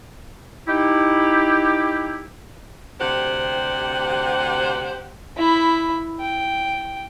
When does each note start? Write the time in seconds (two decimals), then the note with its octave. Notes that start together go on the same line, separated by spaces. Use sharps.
0.67 D#4 E4 G4
3.00 D2 C3 G4 C5 F#5
5.38 E4 B5
6.21 G5